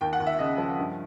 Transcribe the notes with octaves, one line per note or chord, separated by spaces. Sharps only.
D#2 G5
F#5
D#2
E5
C#3 D#5
F3
G2